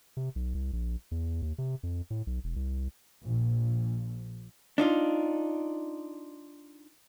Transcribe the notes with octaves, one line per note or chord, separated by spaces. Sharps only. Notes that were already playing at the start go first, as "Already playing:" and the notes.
C3
B1
C2
A#1
E2
D#2
C3
F2
A2
B1
E1
C2
A#1
D4 D#4 F4